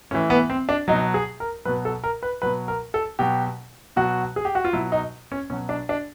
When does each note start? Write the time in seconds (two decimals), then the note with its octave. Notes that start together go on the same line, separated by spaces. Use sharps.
0.11 A2 E3 C#4
0.30 B3
0.50 C4
0.69 D4
0.88 F#3 D#4
0.92 B2
1.14 G#4
1.40 A#4
1.65 B2 F#3 B4
1.85 A4
2.04 A#4
2.23 B4
2.42 B2 F#3 B4
2.68 A#4
2.94 A4
3.19 B2 F#3 G4
3.96 B2 F#3 F#4
4.36 G#4
4.45 G4
4.55 F#4
4.65 F4
4.73 B2 F#3 E4
4.92 D#4
5.32 C#4
5.50 B2 F#3 C#4
5.69 D4
5.89 D4